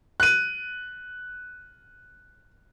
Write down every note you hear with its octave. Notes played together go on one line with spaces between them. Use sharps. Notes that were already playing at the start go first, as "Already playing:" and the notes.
F#6 D#7